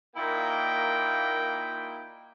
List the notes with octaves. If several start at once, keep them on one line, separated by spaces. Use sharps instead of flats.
A#2 A#3 D#4 E4 G5